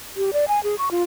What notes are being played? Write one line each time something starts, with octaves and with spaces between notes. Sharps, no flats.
G4
D5
G#5
G#4
C#6
F4